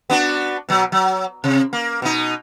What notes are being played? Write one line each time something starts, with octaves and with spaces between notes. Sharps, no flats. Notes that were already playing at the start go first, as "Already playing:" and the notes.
B3 D4 F#4
B2 F#3
F#3
C3
A#3
B2 D#4